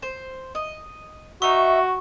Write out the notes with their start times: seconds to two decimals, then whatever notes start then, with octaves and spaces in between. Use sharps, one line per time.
0.02 C5
0.55 D#5
1.42 D#4 F#4 E5 C#6